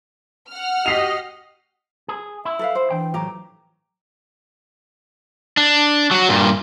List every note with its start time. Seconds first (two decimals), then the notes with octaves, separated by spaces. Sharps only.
0.49 F#5 F6
0.86 F#4 G4 D#5 B6 C7 F7
2.08 G#4
2.45 E4 E5
2.59 A4 B4 F5
2.75 C5
2.91 E3 D4 G5
3.14 A2 F#3 G4 A#5
5.57 D4
6.11 F#3 F#4
6.29 G2 A#2